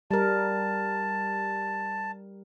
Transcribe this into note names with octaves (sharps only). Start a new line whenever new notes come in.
G3 A#4 A5